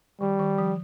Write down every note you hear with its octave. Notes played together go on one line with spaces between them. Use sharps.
D#3 G3
D#3
F3